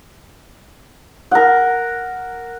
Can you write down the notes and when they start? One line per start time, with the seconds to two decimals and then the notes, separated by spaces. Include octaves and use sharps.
1.31 A#4 F#5